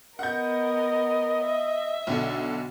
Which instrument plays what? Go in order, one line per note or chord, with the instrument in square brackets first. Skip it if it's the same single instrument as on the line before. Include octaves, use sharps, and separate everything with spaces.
[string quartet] B3 A#4 [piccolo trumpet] D#5 [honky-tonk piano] F#5 G6
[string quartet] E5
[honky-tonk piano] B1 D3 A4